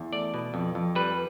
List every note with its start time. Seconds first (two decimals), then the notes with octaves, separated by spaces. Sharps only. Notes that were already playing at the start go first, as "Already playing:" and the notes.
Already playing: E2
0.13 A3 D5
0.34 B2
0.54 F2
0.75 F2
0.95 G3 B4